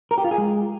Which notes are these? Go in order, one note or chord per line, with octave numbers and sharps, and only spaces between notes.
A#4
G4
F4
G#4
G#3